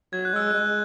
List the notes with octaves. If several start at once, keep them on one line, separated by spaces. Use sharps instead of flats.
F#3 G#6
F#6
G#3 E6
F#6
G#3